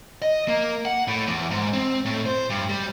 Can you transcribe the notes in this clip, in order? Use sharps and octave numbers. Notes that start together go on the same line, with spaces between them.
D#5
A#3
F#5
A2
E2
G#2
C4
A2
C5
G2
G3